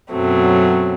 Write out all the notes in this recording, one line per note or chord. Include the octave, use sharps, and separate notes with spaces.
F#2 B2 F#3 A3 C4